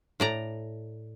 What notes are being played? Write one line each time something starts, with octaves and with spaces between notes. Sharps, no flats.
A2 D5 A#5